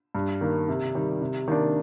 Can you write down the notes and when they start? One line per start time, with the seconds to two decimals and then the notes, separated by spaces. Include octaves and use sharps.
0.15 G2
0.41 D#3 A#3
0.68 C3
0.95 D#3 G3
1.21 C3
1.48 D#3 A#3 D4